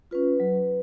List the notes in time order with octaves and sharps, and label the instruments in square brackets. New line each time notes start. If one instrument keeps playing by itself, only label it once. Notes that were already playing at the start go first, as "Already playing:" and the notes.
[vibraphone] C#4 F4 B4
F#3